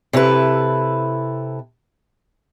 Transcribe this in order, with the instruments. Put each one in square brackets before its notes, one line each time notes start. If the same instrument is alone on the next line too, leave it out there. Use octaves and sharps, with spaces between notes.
[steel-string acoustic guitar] C3 E4 A4 B4